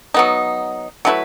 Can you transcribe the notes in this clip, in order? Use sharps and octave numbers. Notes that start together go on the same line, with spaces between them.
F#3 B3 D#4
F#3 A3 E4 B4